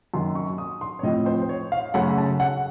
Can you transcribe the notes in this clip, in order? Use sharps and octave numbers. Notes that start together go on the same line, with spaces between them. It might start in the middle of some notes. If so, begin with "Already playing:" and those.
F#2 D#3 A#3 C6
C#6
D#6
C6
C#5
A2 F3 C4 D#5
C5
C5
C#5
F5
F#2 C#3 A3 C#4 F#5
A5
F#5